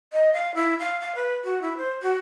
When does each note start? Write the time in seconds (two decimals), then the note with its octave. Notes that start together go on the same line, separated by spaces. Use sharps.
0.13 D#5
0.33 F5
0.55 E4
0.79 F5
1.00 F5
1.15 B4
1.44 F#4
1.62 E4
1.77 C5
2.02 F#4